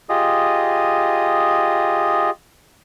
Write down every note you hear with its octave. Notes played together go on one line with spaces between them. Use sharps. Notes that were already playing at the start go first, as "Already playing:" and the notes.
F4 G4 G#4 D#5 D#6